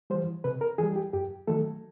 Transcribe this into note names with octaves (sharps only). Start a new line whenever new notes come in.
E3 G3 C5
C3 B4
A#4
E3 G3 G#4
G4
F#2 G4
D#3 F#3 A3 A4